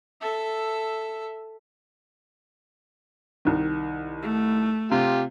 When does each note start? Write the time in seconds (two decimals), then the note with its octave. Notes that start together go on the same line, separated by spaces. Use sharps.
0.21 A4 E5
3.45 C2 D#3
4.23 A3
4.91 C3 F4 G4